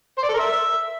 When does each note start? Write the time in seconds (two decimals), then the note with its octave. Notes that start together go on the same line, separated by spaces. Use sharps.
0.18 C5
0.23 D5
0.29 A4
0.34 A#4
0.39 E5